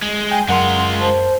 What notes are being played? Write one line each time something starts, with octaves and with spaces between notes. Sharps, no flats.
G#3
G5 G#5
F#2 G#3 F4 A#4 F#5 C6
C5 A5